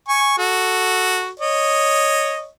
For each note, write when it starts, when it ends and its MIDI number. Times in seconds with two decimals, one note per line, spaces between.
0.08 0.33 80
0.08 0.33 85
0.38 1.30 66
0.38 1.30 69
1.40 2.48 73
1.40 2.48 75